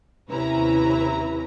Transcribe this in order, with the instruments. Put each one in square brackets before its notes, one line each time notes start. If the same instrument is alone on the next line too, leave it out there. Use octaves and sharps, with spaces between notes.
[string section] D#2 C3 C#4 E4 B4 A#5